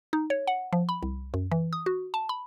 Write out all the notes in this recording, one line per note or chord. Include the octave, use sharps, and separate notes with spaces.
D#4
C#5
F#5
F3
B5
C2
F#2
E3
D#6
F#4
A5
B5